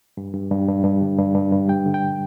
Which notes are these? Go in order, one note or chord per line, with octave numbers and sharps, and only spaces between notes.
G2
G2
G2
G2
G2
D3
G2
G2
G2
G3 G5
D3
G5